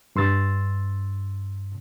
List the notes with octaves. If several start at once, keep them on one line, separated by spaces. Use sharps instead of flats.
G2 C6 E6 A6